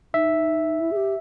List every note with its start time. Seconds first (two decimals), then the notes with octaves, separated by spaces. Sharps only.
0.14 D#4 E5
0.80 E4
0.91 G#4
0.96 G4